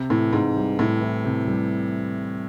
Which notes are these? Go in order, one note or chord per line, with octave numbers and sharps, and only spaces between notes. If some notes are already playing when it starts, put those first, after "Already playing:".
Already playing: C3
A2 E3
G#2 C3
G3
A2 C3
E3
C3
G3